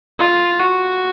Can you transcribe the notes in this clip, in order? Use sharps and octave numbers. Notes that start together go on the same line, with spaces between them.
F4
F#4